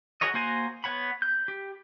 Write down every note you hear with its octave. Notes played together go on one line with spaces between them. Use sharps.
F#4 G#4 A#4 C#5 D#5
A#3 F#4 C5 G#5 A#5
B3 C#5 F#5 B5
G6
G4